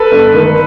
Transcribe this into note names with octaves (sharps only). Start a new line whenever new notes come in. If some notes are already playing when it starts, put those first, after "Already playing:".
Already playing: A4 B4
G1
D#3